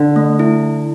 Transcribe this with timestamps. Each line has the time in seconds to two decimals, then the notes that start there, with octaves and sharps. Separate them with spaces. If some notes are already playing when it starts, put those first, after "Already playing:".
Already playing: D3
0.16 A3
0.39 E4